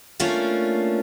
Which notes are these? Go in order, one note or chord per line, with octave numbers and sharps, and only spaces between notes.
A3 A#3 C#4 D4 F4